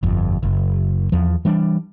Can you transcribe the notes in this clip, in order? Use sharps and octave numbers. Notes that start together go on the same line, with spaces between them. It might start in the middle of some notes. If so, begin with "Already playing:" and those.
G1 F2
F#1
E2 F3
E3 G3 D4